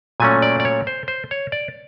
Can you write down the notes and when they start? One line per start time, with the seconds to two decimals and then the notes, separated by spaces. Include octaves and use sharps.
0.20 A#2 F#3 A3 C#4 G#5
0.42 D5
0.60 D5
0.65 C#5
0.87 C5
1.08 C5
1.31 C#5
1.52 D5